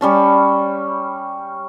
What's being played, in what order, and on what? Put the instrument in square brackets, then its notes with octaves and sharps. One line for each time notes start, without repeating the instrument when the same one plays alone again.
[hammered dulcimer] G3 C#4 A5